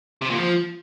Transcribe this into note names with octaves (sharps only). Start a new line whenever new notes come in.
C3
A#2
F3